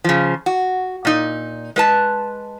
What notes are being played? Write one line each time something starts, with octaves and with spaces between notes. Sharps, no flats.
C#3 F3
F#4
A#2 D#4
G#3 B4 A5